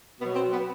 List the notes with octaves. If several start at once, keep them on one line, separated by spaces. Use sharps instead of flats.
B2 F#3 B3
C4
B3